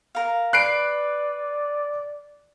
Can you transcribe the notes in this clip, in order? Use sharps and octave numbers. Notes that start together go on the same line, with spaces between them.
A#4 F5
B4 D5 F#6 C7 D7